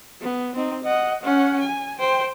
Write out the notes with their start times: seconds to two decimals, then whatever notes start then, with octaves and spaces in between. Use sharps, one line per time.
0.22 B3
0.55 C4 D#4
0.84 D#5 F#5
1.23 C#4 F#5
1.60 G#5
1.99 C5 G5